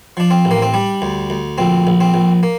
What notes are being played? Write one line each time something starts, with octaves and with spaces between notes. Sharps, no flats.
F3 D4
C4
A1
A#3
C4
G3 D4
D2
D2
A#1 C4
A#1
C4
A#1
A#3